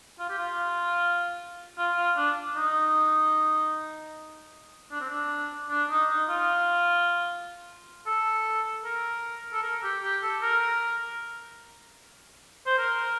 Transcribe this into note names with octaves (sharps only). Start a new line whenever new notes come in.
F4
G4
F4
F4
F4
D4
D#4
D4
C4
D4
D4
D#4
D#4
F4
A4
A#4
A4
A#4
G4
G4
A4
A#4
C5
A#4